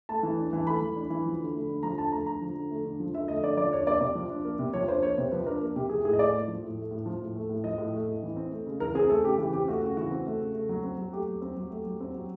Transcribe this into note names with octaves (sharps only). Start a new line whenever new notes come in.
A3 A5
E3
D4
E3
A3 B5
E3
D4
E3
F3
D3
A3
D3
F3 A#5
D3 A5
A3 A#5
D3 A#5
F3
D3
A3
D3
F3
D3 E5
A3 D#5
D3 D5
F3 D5
D4 C#5
A#3 D5
C3 D5
F3
D4
A#3
C3
F3 C#5
D4 C5
A#3 C#5
C3 C5
F3 B4
D4 A#4
A#3
C3 G4
F3 G#4
A2 G#4
D#5
A3 D5
A2
F3
A2
A3
A2
F3
A2
A3
A2
F3 D#5
A2
A3
A2
E3
C4
A3
C#3
E3 A#4
C4 G#4
A3 A4
C#3 G4
E3 G4
C4 G4
A3 F#4
C#3 F#4
E3 F#4
C4
A3
C#3
A3
F#3
C4
F#3
A3 G4
F#3
C4
F#3
A3
F#3
C4
F#3